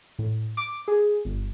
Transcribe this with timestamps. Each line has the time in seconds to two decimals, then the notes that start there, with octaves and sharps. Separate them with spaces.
0.19 A2
0.57 D6
0.88 G#4
1.25 G1